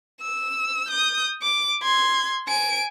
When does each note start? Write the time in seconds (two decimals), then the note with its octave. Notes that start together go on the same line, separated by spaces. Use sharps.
0.22 E6
0.88 D#6 G6
1.42 D6
1.83 C6 G#6
2.47 G#5 D7